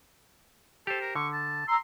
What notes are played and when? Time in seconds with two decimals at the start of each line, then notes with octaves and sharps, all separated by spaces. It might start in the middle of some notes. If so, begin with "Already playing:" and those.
0.87 G4 A4 C5
1.01 A#4
1.15 D3 C#6
1.33 A5
1.68 A#5 C6 E6